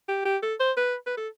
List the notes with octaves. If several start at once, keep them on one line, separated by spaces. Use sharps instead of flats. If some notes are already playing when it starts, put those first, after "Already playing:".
G4
G4
A4
C5
B4
B4
A4